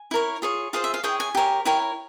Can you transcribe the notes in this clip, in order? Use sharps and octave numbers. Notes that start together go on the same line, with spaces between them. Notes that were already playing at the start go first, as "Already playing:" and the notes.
Already playing: G#5
E4 A#4 C#5
F4 G#4 C#5
F4 G#4 C5 F5
E5
F5
E4 G#4 C#5 G5
G#5
G4 A#4 C#5
E4 A#4 C#5 G5